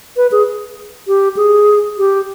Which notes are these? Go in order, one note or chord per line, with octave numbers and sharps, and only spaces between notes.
B4
G#4
G4
G#4
G4